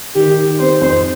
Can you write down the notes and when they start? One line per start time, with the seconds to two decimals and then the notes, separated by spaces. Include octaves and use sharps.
0.15 D#3 G4
0.38 D#3
0.59 C4 C5
0.81 F2